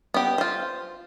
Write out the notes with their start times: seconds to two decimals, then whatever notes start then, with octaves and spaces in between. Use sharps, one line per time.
0.14 B3 G4
0.38 F4 C5